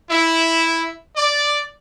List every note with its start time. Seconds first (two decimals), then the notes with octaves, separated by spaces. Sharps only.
0.11 E4
1.16 D5